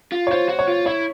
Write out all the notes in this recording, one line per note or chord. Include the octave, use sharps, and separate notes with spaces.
F4
C#5
F4 C5
F#4
C#5
F4
E4 C#5